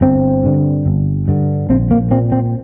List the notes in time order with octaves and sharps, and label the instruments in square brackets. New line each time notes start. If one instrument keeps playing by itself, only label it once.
[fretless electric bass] G1 C4
G2 D3
G1
G2 D3
A#1 C4
A#3
A#2 C4
C4